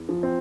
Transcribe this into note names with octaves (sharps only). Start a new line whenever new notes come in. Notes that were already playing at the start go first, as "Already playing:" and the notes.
Already playing: E2
F3
C4